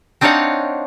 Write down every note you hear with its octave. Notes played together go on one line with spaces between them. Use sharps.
C4 D4 D#4 C#5 F5 F#5